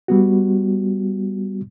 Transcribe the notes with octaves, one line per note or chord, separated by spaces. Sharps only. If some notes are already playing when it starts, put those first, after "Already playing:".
G3 B3 F#4